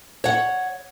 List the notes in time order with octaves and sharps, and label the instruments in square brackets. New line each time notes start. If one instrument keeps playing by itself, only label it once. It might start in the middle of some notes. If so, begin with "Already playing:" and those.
[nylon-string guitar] C#5 F#5